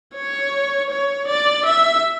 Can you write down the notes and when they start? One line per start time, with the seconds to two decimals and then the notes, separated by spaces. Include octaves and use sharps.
0.15 C#5
0.90 C#5
1.28 D5
1.65 E5